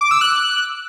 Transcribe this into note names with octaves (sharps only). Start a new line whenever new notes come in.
D6
E6
F#6